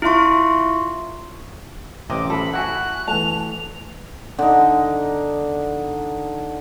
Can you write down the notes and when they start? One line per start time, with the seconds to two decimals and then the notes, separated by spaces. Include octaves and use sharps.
0.02 E4 F4 E5 C6 C#6
2.10 A1 C3 D#5 D6
2.30 A4 B5
2.53 E4 F#4 F#5 G#5 F#6
3.07 E3 A3 A5 F7
4.39 D3 D#4